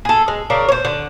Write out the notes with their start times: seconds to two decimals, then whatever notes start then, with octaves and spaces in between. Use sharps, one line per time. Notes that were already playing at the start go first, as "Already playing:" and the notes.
0.05 G#4 A4
0.28 G#3
0.50 C#3 D4 A#4
0.68 C5 C#5
0.85 D3